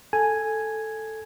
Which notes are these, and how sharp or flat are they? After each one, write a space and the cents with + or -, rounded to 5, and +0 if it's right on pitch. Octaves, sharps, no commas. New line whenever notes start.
A4 +0 G#5 +0